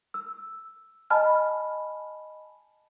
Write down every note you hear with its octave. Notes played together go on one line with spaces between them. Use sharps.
E6
D#5 G#5 A5 B5 F6